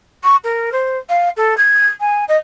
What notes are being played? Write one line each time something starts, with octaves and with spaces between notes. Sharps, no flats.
C#6
A#4
C5
F5
A4
G#6
G#5
D#5